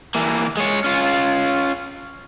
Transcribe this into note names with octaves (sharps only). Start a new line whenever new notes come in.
E3 A#3
G#3 C#5
C#4 F4